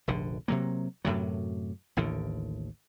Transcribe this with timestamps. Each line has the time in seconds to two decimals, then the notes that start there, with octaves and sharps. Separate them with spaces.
0.08 F1 A#1 D3
0.48 C3 F#3 A#3
1.05 F#2 A2 C3 F#3
1.97 A1 D#2 A2 D3